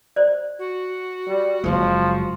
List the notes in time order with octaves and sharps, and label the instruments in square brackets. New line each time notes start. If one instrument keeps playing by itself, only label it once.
[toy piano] C5 D5
[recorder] F#4
[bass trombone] G3
[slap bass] F#1 G#3 [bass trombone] F3